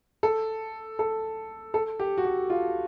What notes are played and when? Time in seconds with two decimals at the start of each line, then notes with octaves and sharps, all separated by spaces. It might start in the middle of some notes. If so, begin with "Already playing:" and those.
0.23 A4
0.99 A4
1.74 A4
2.00 G4
2.17 F#4
2.25 G4
2.50 F4